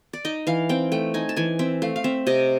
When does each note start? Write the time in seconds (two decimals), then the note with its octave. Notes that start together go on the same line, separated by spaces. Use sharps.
0.13 D5
0.25 D#4 D#5
0.47 E3 F5
0.69 C4 G5
0.92 A3 G5
1.14 D#4 G#5
1.29 A5
1.36 E3 G#5
1.59 C4 E5
1.82 A3 F5
1.96 F5
2.04 C4 E5
2.27 C3 D#5